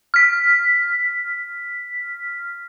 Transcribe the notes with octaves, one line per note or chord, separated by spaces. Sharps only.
F6 B6